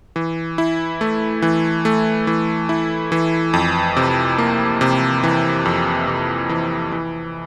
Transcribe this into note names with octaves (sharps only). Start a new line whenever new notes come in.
E3
E4
A3
E3
A3
E3
E4
E3
F2
C3
A#3
C3
E3
F2
C3
E3
E3